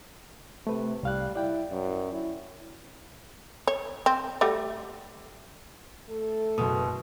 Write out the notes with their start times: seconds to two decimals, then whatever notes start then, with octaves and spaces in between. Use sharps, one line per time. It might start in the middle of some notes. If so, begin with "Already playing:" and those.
0.67 C3 A3 B4
1.03 C2 G3 F5 F#6
1.35 E4 D5 G5
1.71 F#2
2.12 E4
3.67 C#5
4.06 C4
4.41 G3 A3 F#4
6.09 A3 A4
6.58 F#1 B2 D#6